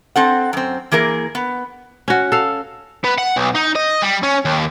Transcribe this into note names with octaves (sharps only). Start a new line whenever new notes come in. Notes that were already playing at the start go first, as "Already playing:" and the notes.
C4 A4 F#5
F#2 C4
E3 A#3 G#4 A#4
B3
C#4 F#4
A4 F5
B3
F#5
B1
D#4
D#5
G3
C#4
D#2